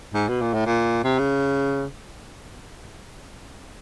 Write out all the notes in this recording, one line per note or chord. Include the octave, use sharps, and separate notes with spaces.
G#2
B2
A#2
A2
A#2
C3
C#3